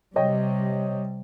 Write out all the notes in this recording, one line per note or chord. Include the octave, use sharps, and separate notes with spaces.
C3 G3 C#5 D#5 G5